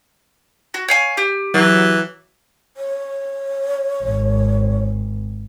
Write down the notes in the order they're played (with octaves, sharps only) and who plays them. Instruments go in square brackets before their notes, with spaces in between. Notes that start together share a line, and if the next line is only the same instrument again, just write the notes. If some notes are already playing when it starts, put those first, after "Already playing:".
[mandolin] F#4
C#5 F5 G#5
G4
[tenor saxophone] E3 [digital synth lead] F#3
[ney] C#5
[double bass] G#1